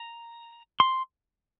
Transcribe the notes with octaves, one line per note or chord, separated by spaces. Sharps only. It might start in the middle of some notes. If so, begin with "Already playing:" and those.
Already playing: A#5
C6